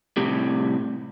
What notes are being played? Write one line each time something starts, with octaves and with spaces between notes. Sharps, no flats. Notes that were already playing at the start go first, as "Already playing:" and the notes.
A2 C3 G3